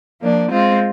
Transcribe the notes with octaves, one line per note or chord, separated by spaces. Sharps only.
F3 A#3 D4
G#3 C4 F4